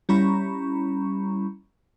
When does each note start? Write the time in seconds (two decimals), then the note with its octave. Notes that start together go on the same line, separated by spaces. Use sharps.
0.09 G3 C#4 E4 A#5 B5 C#6